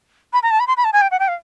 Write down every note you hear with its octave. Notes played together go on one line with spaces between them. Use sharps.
B5
A#5
A5
B5
C6
B5
A5
G#5
G5
F#5
G5
F5